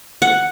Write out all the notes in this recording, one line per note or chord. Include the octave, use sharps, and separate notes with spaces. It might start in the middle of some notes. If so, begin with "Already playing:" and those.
F#5